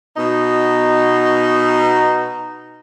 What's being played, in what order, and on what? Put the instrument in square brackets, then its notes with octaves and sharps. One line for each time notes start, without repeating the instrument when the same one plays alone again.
[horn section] B2 B3 D#4